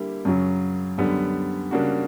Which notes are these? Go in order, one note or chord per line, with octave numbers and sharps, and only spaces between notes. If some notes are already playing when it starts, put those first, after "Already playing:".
Already playing: D3 G3 A#3 E4 G4
F#2 C#3 F#3
F#2 D3 G3 B3
C#3 G3 A#3 D4 F#4